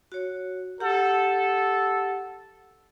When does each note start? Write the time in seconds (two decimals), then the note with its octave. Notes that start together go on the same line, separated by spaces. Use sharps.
0.12 F#4 C#5
0.80 G4 A4 F#5